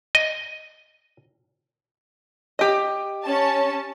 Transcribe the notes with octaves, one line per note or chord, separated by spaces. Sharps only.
D#5
G4 D#5
C#4 A5